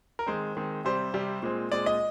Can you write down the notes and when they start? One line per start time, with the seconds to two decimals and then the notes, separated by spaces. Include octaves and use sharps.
0.19 A#4
0.27 D#3 G#3 C4 C5
0.57 D#3 G#3 C4
0.84 C3 G3 C4 C5
1.14 C3 G3 C4
1.43 A#2 G#3 C4
1.72 A#2 G#3 C4 D5
1.86 D#5